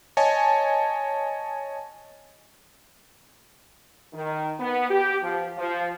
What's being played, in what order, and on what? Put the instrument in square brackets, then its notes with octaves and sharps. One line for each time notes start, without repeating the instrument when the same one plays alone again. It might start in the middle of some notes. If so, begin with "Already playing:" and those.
[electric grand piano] C#5 D#5 G#5 A5
[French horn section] D#3
B3
G4
F3
F3